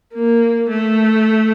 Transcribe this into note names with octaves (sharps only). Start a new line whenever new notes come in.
A#3
A3